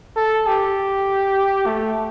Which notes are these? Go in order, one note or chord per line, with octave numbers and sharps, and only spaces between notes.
A4
G4
A3